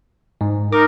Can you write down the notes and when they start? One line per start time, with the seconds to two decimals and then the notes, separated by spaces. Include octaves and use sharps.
0.41 G#2
0.73 D#4 A#4 D6